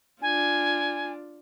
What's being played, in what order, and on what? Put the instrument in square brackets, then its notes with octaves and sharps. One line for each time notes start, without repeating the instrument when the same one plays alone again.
[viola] D4 F4 [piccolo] G#5